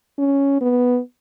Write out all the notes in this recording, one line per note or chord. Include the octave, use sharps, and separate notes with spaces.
C#4
B3